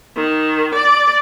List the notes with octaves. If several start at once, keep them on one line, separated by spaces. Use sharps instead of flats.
D#3
D5